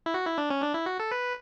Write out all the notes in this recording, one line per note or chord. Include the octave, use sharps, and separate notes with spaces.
E4
F#4
E4
D4
C#4
D4
E4
F#4
A4
B4